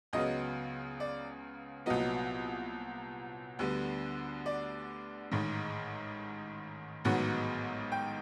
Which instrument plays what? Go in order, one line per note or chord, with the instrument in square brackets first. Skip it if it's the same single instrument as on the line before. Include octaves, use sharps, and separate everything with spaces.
[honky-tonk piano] C#2 C#3 F#3 B3 D#5
D5
C2 A#2 F#3 B3 D#5
D2 D3 G3 B3
D5
A1 G#2 D#3
A1 G#2 D#3 F#3 B3 F#5
G5